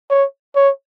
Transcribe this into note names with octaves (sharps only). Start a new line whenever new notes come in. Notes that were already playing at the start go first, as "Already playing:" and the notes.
C#5
C#5